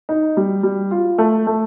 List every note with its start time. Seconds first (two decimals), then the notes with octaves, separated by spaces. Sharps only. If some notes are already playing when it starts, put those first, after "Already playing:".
0.09 D#4
0.37 G3
0.63 G3
0.91 F4
1.18 A3
1.47 A3